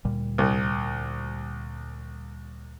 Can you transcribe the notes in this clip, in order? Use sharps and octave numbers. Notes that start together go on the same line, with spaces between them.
D2 A#2 G3
C2